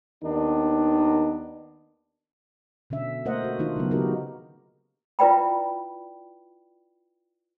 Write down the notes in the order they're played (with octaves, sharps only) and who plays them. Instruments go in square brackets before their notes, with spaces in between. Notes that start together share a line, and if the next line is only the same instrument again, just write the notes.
[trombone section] D#2 D#3 B3 D4 D#4
[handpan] B2 D3 C#4 E5
A3 A#3 A#4 C5 D#5 F#5
F#4
D#3 D4 D#4 F4
C#3 F#3 B3
C#3 B3 D#4 F#4 G4 A#4
[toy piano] E4 F4 B4 D5 G5 B5